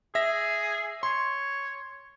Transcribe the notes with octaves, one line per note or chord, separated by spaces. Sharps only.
G#4 E5 A#6
C#5 C6